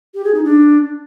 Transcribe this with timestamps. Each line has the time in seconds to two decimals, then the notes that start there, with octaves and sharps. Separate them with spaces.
0.14 G4
0.24 G#4
0.35 D#4
0.45 D4